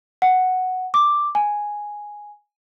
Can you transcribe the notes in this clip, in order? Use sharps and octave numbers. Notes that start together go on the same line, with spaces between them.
F#5
D6
G#5